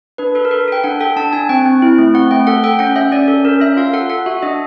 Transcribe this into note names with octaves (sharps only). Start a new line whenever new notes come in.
D4 B4
A4 B4
A#4
A4 B4
A4 G5
D4 F#5
A4 G5
D4 A5
D4 G#5
C4 G5
C4
E4
A3
C4 F#5
A3 G5
A4 F#5
A4 G5
C#4 F#5
C#4 E5
C#4 D5
A4
C#4 A#4
C#4 E5
F4 F5
A4 F#5
A4 F#5
F#4 E5
D4 D#5